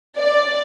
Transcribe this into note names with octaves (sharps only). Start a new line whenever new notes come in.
D5